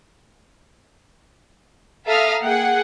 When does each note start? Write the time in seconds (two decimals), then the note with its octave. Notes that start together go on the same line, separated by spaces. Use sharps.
2.07 A4 E5 F5 A#5 D#6 F6
2.43 A#3 G#4 F#5 G5